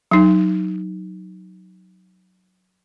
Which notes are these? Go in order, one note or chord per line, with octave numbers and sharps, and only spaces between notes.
F#3 D#4